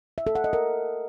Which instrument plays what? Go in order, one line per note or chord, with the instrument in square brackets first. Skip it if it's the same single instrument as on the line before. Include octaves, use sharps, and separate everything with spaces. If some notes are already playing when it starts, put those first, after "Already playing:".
[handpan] E5
A4
F#5
D#5
A#4